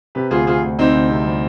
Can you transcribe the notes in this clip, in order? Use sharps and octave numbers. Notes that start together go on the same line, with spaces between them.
C3 G4 B4
D2 F4 G#4
C3 F4 G#4
D2
D2 C4 D#4
D2
C3
G3